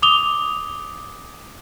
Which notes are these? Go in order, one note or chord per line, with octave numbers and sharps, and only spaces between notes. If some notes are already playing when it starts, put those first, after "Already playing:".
D6 D#6 F7 G7